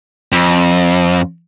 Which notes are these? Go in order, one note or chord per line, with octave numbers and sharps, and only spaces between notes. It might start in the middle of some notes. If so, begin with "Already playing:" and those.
F2